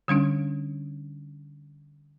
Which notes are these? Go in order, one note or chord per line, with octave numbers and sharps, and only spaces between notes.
D3 G3 C#4 D4